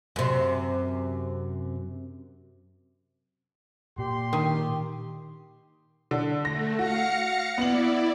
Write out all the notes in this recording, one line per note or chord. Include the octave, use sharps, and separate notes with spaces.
F#2 C3
A#2 G4 C6
D#3
D3
A3 A#6
F#4 F5 A#6 C#7
B3 E4 D5 F#7